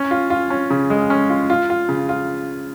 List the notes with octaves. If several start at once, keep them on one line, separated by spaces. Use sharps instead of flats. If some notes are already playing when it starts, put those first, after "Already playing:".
Already playing: C#4
F4
F4
C#4
C#3
G#3
C#4
F4
F4
F4
C#3
F4